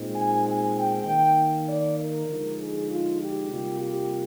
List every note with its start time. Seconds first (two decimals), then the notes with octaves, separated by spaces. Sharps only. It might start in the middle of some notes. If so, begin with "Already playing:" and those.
Already playing: A#2 G#3 C4 D#4
0.13 G#5
0.44 G#5
0.74 G5
1.05 D#3 A#3 D#4
1.66 D5
1.96 A#4
2.28 D3 F3 G#3 D#4
2.57 G#4
2.89 F4
3.19 G4
3.49 C3 G3 A#3 F4
3.80 G4